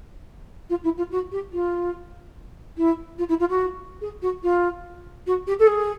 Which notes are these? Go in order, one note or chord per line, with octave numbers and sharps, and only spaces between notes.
F4
E4
F4
F#4
G4
F4
E4
F4
E4
F4
F#4
G#4
F#4
F4
F#4
G4
A4
G#4